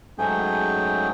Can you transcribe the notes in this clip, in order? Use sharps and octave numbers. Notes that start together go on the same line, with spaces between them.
G#2 F#3 A3 C#4 G#4 G5